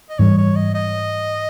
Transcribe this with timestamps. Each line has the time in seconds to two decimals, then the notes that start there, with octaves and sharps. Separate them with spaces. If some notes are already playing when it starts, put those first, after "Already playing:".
0.09 D#5
0.19 G#2 E3 G3 C#5
0.38 C#5
0.56 D#5
0.74 D#5